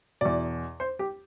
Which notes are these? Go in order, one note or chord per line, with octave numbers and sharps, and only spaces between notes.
E2 B2 D5
C5
G4